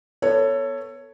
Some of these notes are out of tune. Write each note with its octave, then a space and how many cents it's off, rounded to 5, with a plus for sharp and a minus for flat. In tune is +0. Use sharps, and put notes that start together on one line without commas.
B3 +0 A4 +20 C#5 +0